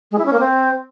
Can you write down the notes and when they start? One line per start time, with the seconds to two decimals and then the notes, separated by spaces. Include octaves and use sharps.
0.11 G#3
0.18 E4
0.26 C#4
0.33 A#3
0.40 C4